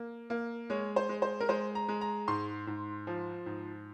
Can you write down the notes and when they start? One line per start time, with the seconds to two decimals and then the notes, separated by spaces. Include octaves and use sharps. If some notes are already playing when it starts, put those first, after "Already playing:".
Already playing: A#3
0.30 A#3
0.70 G#3 C#5
0.96 C5
1.09 G#3
1.22 C5
1.40 A#4
1.49 G#3 C5
1.75 A#5
1.88 G#3
2.01 A#5
2.28 G#2 C6
2.67 G#2
3.07 F3
3.46 G#2